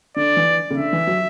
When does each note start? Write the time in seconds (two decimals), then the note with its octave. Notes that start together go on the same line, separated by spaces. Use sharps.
0.16 D3 D5
0.37 E3
0.70 C#3
0.77 D3 E5
0.93 E3
1.07 F#3